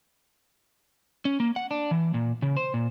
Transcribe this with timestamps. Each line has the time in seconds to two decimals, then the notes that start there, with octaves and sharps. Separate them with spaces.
1.25 C#4
1.40 A#3
1.56 F#5
1.71 D4
1.91 E3
2.14 A#2
2.42 C#3
2.57 C5
2.74 A#2